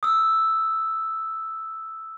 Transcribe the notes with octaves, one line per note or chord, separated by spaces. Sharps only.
D#6 E6